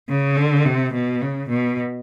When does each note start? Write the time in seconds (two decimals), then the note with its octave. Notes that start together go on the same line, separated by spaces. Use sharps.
0.09 C#3
0.37 D3
0.65 C3
0.94 B2
1.22 C#3
1.50 B2